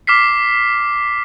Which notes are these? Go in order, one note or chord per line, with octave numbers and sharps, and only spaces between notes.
D6 F6 B6 C7